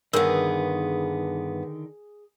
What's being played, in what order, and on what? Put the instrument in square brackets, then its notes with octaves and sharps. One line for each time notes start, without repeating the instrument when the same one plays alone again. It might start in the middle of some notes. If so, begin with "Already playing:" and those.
[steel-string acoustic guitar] G2 B3 [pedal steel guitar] D3 D#3 [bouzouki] G#4 [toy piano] A#4